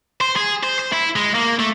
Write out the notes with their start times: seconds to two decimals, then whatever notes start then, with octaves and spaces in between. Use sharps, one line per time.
0.21 C5
0.36 G#4
0.63 C5
0.79 C5
0.93 E4
1.16 G#3
1.35 A#3
1.59 A3